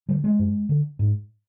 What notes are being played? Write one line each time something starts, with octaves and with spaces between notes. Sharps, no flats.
D3 G3
G#3
F#2
D3
G#2